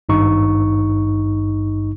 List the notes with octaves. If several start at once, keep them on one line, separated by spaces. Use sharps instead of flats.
G#1 G2 D#4 C#6